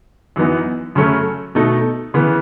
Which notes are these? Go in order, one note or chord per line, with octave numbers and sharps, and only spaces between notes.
F#2 E3 B3 D#4
F#2 C#3 F#3 A3 C#4
B2 A3 D#4
C#3 E3 B3